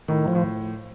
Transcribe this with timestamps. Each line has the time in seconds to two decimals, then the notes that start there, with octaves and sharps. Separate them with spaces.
0.08 A2 D#3
0.28 F3
0.35 A2